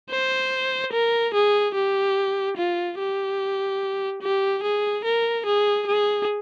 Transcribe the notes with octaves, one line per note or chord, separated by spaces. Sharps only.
C5
A#4
G#4
G4
F4
G4
G4
G#4
A#4
G#4
G#4